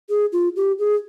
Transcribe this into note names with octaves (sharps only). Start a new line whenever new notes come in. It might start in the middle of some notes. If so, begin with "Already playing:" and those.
G#4
F4
G4
G#4